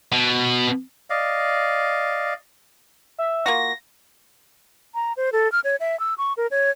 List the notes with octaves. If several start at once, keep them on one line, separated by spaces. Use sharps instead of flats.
B2
D5 D#5 F5
E5
A#3 F4 F#4 A#6
A#5
C5
A4
F6
C#5
E5
E6
C#6
A#4
C#5